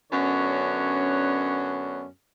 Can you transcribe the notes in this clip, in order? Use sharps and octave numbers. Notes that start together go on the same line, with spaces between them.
F#2 D3 B3 C#4 D4 C#5